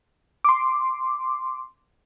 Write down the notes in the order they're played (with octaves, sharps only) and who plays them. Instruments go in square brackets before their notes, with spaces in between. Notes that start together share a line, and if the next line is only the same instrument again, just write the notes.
[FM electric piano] C6 D6